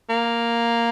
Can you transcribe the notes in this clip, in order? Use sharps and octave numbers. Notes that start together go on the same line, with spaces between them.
A#3